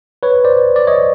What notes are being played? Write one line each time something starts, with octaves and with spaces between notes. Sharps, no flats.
B4 C#5
C5 D5
D5
C#5 D#5